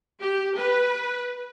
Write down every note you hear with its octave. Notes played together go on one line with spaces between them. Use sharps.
G4
B4